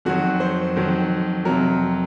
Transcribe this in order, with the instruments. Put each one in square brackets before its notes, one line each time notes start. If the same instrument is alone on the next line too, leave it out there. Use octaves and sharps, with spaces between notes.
[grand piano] F2 D#3 F#3 F#4
C5
F2 D#3 F#3
F2 C3 F#3 A#4